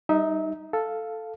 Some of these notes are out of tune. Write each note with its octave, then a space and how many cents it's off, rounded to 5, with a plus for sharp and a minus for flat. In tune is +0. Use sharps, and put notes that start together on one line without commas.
G3 +0 D#4 +0 E5 -35
A4 +0 F5 +0